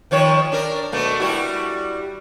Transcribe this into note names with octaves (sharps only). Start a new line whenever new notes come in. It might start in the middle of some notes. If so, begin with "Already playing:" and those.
D#3 F3 C#5
D4 A#4
B2 A3 A#3
G3 E4 F#4